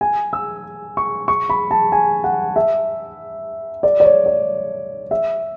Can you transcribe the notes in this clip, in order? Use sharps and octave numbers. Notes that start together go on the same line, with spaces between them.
G#5
E6
C#6
C#6
B5
A5
G#5
F#5
E5
D5
D5
C#5
D5
E5